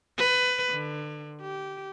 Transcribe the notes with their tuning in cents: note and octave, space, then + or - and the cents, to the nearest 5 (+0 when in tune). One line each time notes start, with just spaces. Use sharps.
B4 +20
D3 +30
G4 -15